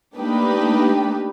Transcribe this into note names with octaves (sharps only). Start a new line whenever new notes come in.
A3 A#3 D4 D#4 G4 B4